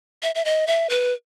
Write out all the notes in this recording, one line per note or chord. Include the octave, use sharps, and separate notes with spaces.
E5
E5
D#5
E5
B4